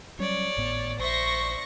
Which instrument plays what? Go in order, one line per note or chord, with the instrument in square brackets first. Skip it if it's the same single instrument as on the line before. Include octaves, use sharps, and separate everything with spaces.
[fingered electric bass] F#3 G3 C#4 [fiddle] C#5 D5
[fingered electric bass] G#1 A2 B3
[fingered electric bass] A#1 [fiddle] C5 E5 [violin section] D5 C#6 A#6